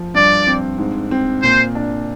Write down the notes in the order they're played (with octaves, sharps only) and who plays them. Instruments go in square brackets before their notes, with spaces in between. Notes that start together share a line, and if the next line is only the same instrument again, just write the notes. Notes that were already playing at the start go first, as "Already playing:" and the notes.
Already playing: [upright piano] F3
[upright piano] G2 [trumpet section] D5
[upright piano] C4
G#2
C4
[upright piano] A#2 [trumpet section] C5
[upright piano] D4